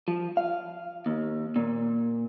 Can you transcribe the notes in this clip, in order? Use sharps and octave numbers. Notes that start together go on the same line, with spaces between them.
F3
F5
D#2
A#2